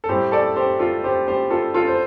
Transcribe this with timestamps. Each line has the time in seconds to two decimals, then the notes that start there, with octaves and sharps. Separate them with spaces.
0.04 A4
0.09 A2 G3 C4 G4 C5
0.32 A4 D5
0.56 G4 C5
0.79 F4 A4
1.04 G4 C5
1.28 G4 C5
1.50 F4 A4
1.74 F4 A4
1.87 C5